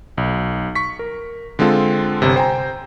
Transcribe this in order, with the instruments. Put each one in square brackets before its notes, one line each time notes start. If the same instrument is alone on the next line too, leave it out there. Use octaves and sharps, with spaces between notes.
[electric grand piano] B1
C#6 B6
A#4
D3 G#3 C4 F4 A4
G1 C3
C5 G5 G#5 A#5